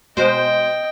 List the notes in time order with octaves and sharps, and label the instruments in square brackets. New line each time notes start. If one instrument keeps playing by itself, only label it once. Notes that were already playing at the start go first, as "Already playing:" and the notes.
[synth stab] B2 G#3 C5 [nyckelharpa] D#5 G5